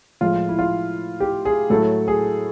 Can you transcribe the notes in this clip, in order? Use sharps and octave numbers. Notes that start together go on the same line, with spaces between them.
A2 F3 G#3 F4
E4
F4
G4
G#4
A2 F#3 A3 A4
G#4